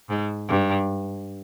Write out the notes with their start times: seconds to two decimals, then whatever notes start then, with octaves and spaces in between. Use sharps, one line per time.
0.09 G#2
0.48 G2